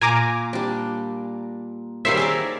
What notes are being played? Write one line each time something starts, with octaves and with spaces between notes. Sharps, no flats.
A#2 G#5 A#5 D6
G3 D4
D#3 G3 A#3 C4 C#5 E5 C7
G#4 A#4 D5